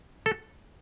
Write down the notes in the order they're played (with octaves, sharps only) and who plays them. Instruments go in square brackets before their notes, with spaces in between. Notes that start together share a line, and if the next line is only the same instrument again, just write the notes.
[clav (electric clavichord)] A4